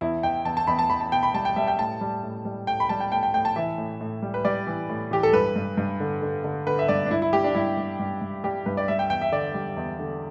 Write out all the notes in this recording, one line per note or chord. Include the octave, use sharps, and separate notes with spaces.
E2 E4
E2 G5
E2 A5
A5
E2 B5
A5
E2 B5
A5
B2 G5
B5
G3 A5
G5
G3 E5
G5
A2 A5
G3
A2
G3
A2 G5
B5
G3 A5
G5
A2 G5
G5
A2 G5
A5
E3 E5
A2
A2
G3
B4
G3 D5
E3
A2
E3 G4
A4
G2 B4
G2
G2
D3
D3
D3
D3 B4
E5
G2 D5
D4
G2 E4
E4
G3 G4
D4
G2 E4
G3
G2
G2
G3 G4
G2 B4
D5
G3 E5
G5
E2 G5
E5
D3 D5
G3
E2
D3